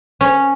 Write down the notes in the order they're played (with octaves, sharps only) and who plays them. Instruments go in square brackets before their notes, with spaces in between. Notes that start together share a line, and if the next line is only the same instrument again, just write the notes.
[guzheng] C#4